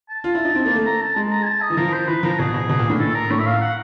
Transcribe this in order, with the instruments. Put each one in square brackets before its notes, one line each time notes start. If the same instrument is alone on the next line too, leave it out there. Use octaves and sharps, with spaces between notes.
[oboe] A5
[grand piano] F4
E4
D#4
C4
A#3
A3
[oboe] A#5
A5
[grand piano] G#3 [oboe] A5
[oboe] A#5
G#5
A5
D#5
[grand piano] E3
[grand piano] F3 [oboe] A#4
[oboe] C5
[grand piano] E3 [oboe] B4
[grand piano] F3 [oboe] A#4
[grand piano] B2 [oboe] G#4
[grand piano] B2
B2
A#2
A2
[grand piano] A2 [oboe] A4
[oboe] A#4
[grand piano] A2 [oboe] C#5
[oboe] E5
F5
F#5